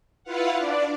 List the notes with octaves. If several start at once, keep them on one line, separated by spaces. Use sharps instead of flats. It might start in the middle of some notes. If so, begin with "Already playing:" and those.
E4 F4 B4 F5 F#5
D4 D5